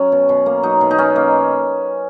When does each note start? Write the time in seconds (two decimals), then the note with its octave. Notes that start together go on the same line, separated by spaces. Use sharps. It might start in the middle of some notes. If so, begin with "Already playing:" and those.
Already playing: F#3 C#4
0.12 B2
0.29 B2
0.46 A#3
0.63 F#3 D#4
0.81 B2
0.91 D#4
0.98 B2 C#4
1.16 A#3